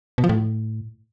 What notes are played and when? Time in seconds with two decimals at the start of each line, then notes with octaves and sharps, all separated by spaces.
0.18 B2
0.24 F3
0.29 A2